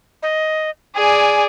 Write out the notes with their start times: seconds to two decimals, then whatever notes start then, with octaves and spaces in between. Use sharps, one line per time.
0.23 D#5
0.96 G#4 D5 G#5